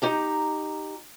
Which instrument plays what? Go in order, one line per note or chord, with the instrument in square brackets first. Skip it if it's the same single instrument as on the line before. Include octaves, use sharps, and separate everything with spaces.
[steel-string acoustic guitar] D#4 G4 A#5